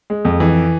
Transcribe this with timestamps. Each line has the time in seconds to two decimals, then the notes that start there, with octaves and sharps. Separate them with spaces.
0.10 G#3
0.25 F2
0.40 E3